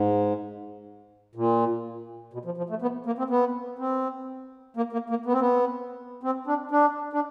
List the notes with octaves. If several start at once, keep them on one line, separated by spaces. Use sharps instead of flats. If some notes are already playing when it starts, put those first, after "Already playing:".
Already playing: G#2
A#2
B2
F3
F3
A3
B3
A#3
C4
B3
C4
A#3
A#3
A#3
B3
C4
B3
C4
D4
D4
D4